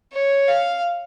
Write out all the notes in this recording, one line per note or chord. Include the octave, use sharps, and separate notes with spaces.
C#5
F5